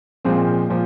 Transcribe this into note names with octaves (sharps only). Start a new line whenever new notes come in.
A#2 F3 G#3 C4
A#2 F3